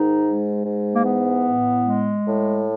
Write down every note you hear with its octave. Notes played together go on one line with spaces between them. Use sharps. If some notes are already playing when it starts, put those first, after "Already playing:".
Already playing: G#2 D#3 D#4
G#3
G#2
A#3
E3 B3
A2
G#3
A2